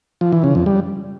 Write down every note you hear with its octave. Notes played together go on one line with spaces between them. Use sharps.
F3
E3
C#3
F2
G3